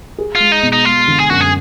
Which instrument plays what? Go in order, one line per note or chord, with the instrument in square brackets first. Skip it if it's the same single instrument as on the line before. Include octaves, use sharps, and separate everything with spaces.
[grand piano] G#4
[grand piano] G#3 [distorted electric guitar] F4
[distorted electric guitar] D#4
[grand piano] B2
[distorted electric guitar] D#4
[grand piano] G#3 [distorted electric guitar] F4
[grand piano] D3
[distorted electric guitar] G#4
[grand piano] F#2 [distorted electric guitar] F#4
[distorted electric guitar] G#4